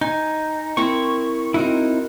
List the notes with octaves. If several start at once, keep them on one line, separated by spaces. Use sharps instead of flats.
D#4 G#5
C4 E4 A#4 C#6
C4 D#4 E4 F#4 A#4